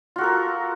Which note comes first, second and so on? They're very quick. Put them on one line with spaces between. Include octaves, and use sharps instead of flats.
F4 F#4 A4 A#4